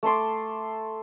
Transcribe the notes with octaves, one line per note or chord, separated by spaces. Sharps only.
A3 A5 C6 D6